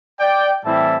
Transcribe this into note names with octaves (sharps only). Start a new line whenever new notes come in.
D5 G5
A2 E3 G3 C4 E4 E5 A5